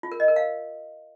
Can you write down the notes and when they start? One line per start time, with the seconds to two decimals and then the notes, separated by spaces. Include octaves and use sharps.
0.03 F4
0.12 A#4
0.20 D#5
0.28 A#4
0.36 F5